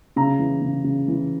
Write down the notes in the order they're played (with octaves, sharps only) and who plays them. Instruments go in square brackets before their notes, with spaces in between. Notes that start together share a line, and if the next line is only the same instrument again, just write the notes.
[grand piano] C#3 A#5
E3
C#3
C#3
E3